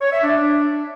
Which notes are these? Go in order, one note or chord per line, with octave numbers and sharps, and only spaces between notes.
C#5
E5
D4